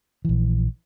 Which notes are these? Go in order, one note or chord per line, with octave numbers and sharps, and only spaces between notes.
A#1 E3